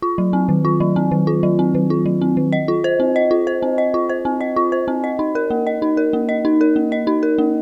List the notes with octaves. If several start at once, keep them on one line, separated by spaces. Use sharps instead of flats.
F4
F#3
C4
D#3
F4
F#3
C4
D#3
F4
F#3
C4
D#3
F4
F#3
C4
D#3
D#5
F4
C5
C4
D#5
F4
C5
C4
D#5
F4
C5
C4
D#5
F4
C5
C4
D#5
D#4
A#4
A#3
D#5
D#4
A#4
A#3
D#5
D#4
A#4
A#3
D#5
D#4
A#4
A#3